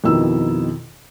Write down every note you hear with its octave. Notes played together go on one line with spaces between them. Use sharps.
F2 B2 D#3 D#4 E4 E6